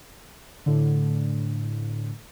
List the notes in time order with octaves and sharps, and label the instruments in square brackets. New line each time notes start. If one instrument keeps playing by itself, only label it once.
[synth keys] A2 D3